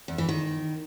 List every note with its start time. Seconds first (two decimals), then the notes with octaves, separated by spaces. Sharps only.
0.08 E2
0.18 E3
0.29 D#3